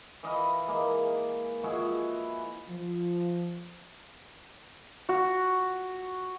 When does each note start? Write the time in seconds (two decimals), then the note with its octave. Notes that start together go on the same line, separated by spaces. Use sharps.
0.23 E3 D#5 F5 B5
0.68 G#3 A#3
1.63 F3 G#3 E4 F#4
2.69 F3
5.09 F#4